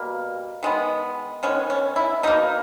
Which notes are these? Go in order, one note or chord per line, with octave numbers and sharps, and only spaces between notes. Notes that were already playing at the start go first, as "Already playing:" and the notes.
Already playing: B2 G3 A#3
D#3 G#3 B3
D#3 G#3 B3 C#4
C#4
E4
B2 A#3 D#4